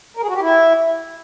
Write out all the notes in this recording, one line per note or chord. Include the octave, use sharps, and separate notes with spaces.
A#4
G#4
F#4
G4
E4